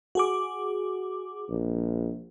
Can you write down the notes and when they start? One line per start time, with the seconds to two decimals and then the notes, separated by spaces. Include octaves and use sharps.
0.15 F#4 G#4 D6
1.50 A#1